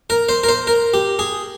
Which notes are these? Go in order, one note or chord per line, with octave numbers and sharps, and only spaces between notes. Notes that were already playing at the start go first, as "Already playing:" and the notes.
A#4
C5
A#4
C5
A#4
G4
G#4